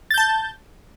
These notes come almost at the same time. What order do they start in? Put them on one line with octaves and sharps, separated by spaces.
A6 G6 A5